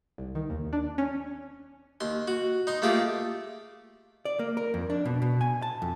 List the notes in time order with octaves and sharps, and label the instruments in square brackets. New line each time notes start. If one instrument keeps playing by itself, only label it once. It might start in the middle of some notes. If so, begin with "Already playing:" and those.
[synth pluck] C2
D#3
D#2
D4
C#4
[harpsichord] D#2 C6
F#4
D#4 C6
A3 A#3 F4 G4 G#4
[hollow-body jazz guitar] D5
A#3
A#4
F2
D4
B2
B2
G#5
A5
F2